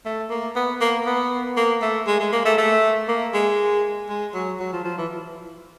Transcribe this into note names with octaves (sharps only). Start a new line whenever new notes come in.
A3
A#3
B3
A#3
B3
A#3
A3
G#3
G#3
A#3
A3
A3
A#3
G#3
G#3
F#3
F#3
F3
F3
E3